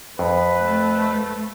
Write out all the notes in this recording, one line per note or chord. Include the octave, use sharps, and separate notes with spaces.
F2 B4
A3